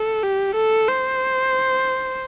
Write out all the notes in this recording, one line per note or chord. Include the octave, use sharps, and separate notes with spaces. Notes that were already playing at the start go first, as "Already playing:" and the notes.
Already playing: A4
G4
A4
C5